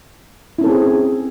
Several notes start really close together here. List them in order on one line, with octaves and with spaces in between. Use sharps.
E4 C#4 A4 C4 G#4